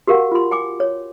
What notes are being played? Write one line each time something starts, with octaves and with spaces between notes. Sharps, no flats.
F#4 G4 A#4 F5 F#5
F4 C6
G5 G#5 D6
C#5